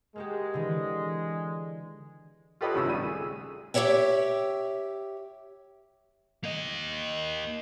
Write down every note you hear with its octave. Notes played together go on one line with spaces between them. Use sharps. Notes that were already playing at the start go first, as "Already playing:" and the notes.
G#3 A#3 F#4 G4
D3 E3
F4 G4 A4 B4 C#5 D#5
G#1 C#2 A2 C#3 E6
G#1 C#3 G3 D#7
A3 G#4
G4 A4 C#5 E5 G5
A#3 D#5